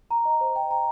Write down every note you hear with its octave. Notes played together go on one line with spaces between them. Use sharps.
A#5
D#5
C5
G5
A#5